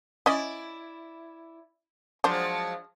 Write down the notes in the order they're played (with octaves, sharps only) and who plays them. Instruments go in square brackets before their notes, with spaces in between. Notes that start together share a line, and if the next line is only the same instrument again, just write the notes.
[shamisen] C#4 D#5 [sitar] E4 D5
[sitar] F3 F#3 G#3 [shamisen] D4 C5